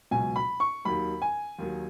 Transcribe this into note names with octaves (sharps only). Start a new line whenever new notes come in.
C#2 B2 F#3 G#5
B5
C#6
D#2 D#3 F#3 B5
G#5
D#2 D#3 F#3